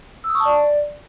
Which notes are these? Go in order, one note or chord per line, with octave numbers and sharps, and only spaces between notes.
E6
D#6
C#6
A5
D5